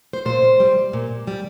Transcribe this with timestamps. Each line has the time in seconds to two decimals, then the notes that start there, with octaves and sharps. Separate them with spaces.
0.13 C5
0.25 A#2 C5
0.60 G3
0.93 A#2
1.27 G3